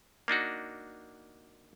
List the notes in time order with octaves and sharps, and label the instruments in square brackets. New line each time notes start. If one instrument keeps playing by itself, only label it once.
[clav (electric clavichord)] A#3 D4 D#4 F#4